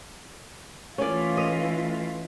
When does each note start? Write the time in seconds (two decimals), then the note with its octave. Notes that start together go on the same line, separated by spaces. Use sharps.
0.98 E3 A3 C#4 F4 D5
1.37 D#5